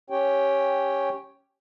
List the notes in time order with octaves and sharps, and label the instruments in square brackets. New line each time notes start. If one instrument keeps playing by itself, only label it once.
[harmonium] C#4 G4 C#5 G5